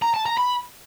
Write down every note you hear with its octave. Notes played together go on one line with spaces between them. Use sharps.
A#5
A5
A#5
B5